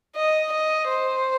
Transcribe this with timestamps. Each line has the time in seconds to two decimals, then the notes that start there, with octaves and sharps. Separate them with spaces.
0.16 D#5
0.52 D#5
0.87 C5